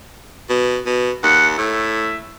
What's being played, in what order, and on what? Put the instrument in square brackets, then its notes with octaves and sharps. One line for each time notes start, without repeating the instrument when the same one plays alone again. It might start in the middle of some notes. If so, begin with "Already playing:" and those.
[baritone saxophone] B2
B2
[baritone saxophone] D#2 [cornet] F#5
[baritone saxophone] A2 [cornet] E5